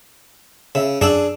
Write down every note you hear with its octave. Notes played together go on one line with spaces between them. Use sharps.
C#3 E5 E6
F#2 D4 G#4 E6